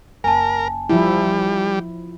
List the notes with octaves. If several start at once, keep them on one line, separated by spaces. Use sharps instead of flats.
F#1 C#4 A#4 G#5 A5
F3 G3 E4